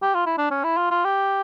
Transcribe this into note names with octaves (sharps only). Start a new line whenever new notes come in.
G4
F4
E4
D4
C#4
E4
F4
F4
G4